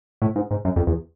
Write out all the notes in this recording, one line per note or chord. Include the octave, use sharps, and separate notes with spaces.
A2
G#2
G#2
F#2
F2
E2